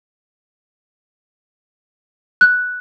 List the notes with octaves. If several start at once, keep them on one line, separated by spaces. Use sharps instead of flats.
F#6